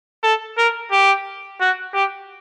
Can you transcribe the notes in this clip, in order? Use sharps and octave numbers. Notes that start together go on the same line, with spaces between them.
A4
A#4
G4
F#4
G4